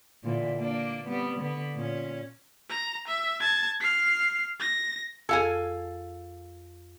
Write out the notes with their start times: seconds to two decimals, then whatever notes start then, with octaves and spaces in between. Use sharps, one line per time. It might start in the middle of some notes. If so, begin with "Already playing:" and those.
0.23 A#2 D3 E3
0.59 A#3 D4
1.07 G3 B3 C4
1.41 D3 B3 B4
1.75 A#2 C#4
2.70 A#5
3.07 E5
3.40 A5 G#6
3.80 F6 C7
4.60 A#6
5.29 F2 G#4 A4 F5 G#5